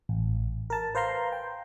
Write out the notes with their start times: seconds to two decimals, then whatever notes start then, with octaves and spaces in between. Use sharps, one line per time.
0.09 A1
0.70 A#4 A5
0.95 B4 C5 F5 A#5 C6
1.32 G5